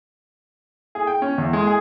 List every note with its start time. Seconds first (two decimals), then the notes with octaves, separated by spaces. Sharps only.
0.95 G#4
1.07 G5
1.22 C#4
1.38 E2
1.53 G#3
1.67 G#4